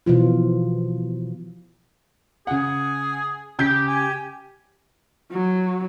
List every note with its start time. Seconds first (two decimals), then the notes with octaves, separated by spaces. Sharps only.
0.06 B2 E3 F3 F4
2.47 C#3 G#4 F#5
3.59 C#3 G4 G6
3.88 G#5
5.32 F#3